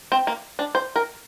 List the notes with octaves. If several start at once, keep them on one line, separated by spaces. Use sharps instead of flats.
C4
A#3
D4
C5
A#4